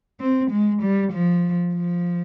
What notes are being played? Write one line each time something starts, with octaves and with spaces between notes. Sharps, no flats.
C4
G#3
G3
F3
F3